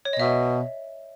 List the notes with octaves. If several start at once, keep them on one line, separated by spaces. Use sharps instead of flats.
C#5
D#5
B2 E5